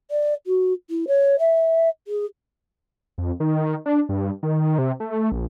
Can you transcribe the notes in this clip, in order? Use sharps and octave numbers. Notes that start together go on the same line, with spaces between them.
D5
F#4
E4
C#5
E5
G#4
F2
D#3
D4
G2
D#3
C3
A3
A#1